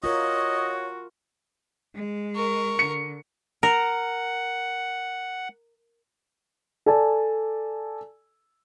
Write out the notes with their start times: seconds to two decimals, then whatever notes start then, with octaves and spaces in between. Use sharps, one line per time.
0.04 F4 F#4 A#4 C#5 D#5
1.96 G#3
2.35 A#4 C#6
2.79 D3 C#7
3.63 A#4 F#5
6.86 A4 D5 G#5 A5